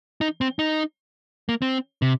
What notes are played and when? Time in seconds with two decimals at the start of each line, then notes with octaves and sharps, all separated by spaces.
0.21 D#4
0.41 C4
0.59 D#4
1.49 A#3
1.62 C4
2.02 C3